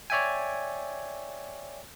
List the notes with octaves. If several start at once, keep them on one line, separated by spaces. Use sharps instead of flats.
C#5 D5 E5 G5 G#5